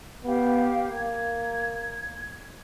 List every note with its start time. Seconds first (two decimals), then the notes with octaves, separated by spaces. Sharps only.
0.24 B3 G4 F5
0.88 A#3 G#6